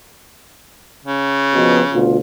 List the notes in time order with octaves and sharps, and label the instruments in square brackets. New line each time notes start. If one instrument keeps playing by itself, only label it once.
[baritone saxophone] C#3
[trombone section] F2 B2
D2 B2 F4